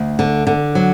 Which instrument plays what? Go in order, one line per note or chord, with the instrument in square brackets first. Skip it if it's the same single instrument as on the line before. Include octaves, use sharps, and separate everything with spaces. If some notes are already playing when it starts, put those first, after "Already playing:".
Already playing: [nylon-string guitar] D2
D3
D3
F#3